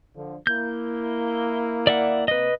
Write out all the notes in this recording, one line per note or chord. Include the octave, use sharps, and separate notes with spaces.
D3 F3
A#3 E4 G6
D5 E5 F#5
C3 A#3 B4 D#5